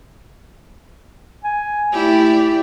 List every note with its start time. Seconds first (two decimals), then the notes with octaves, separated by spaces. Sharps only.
1.44 G#5
1.92 A3 E4 G4 D5